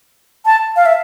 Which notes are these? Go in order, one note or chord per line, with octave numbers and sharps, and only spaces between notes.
A5
F5
E5